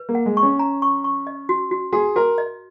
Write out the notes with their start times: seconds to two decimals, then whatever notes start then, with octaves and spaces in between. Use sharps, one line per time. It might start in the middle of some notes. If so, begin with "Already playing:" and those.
Already playing: B4
0.09 A#3
0.15 F#5
0.26 G#3
0.37 C#6
0.43 C#4
0.59 A#5
0.82 C#6
1.04 C#6
1.27 D#5
1.49 F#4
1.71 F#4
1.93 F#4 G#4
2.16 F#4 A#4
2.38 D#5